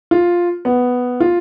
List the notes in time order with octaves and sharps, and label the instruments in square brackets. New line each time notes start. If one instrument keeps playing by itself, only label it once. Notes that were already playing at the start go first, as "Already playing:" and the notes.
[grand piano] F4
B3
F4